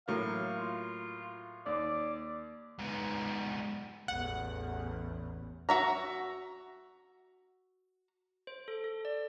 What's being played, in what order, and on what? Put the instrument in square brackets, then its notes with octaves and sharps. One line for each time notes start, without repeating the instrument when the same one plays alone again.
[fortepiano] A2 F#3 A#3 [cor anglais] F5
[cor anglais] F4
[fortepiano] D#2 [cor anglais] D5
[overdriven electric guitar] G#2 B3
[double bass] A1 E2 [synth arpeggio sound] F#5
[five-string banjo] F#4 E5 A#5
[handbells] C5
A4
A4
D5